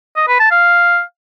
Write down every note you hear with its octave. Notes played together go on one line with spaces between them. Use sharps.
D#5
B4
A5
F5